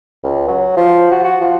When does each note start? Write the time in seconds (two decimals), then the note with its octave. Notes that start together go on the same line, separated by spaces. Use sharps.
0.23 C#2
0.48 F#3
0.77 F3
1.12 F#4
1.24 F#4
1.41 F3